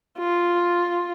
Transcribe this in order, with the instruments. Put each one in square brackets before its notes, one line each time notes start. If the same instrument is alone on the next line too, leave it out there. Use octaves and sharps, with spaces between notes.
[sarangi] F4